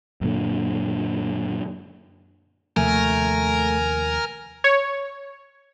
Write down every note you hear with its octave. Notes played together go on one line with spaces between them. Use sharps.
F#2 A#2 D3
D#2 C3 F3 A3 A#4 G#5
C#5